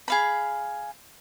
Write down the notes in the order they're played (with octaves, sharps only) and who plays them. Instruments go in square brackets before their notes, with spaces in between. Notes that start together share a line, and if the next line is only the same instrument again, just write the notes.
[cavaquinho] G#4 F5 B5